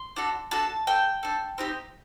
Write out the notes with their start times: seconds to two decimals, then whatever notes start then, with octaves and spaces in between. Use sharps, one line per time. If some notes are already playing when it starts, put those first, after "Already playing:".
Already playing: C6
0.16 D4 F#4 A4
0.51 D4 F#4 A4 A5
0.87 D4 A4 G5
1.23 D4 A4
1.58 C4 D#4 G4